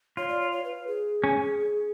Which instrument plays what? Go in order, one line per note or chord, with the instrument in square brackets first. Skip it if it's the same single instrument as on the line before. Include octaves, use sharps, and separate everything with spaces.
[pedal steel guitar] F4 [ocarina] C#5
[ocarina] D5
C#5
C#5
B4
G#4
[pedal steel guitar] C#4